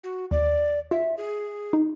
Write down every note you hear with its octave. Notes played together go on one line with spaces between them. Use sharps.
F#4
D#2 D5
F4 E5
G#4
D#4